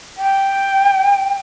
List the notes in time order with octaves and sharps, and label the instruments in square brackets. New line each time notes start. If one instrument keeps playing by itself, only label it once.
[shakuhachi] G5